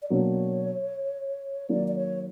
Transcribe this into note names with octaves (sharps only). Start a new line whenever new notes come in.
D5
B2 F#3 A#3 D4 C#5
D#3 F#3 A#3 D5
D5
C#5